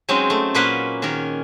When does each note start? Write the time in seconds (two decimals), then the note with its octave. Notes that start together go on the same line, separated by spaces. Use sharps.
0.09 F#3 G#3 C4 C#4 D#4
0.30 A3
0.55 A#2 A#3 C#4 B4 F#5 C6
1.02 D#3 C#4 G#4 A#4